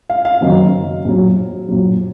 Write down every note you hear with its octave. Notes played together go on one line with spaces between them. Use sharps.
F5
F5
F#1 F#2 D#3 F#3
A#1 A#2 F#3
A#1 A#2 F#3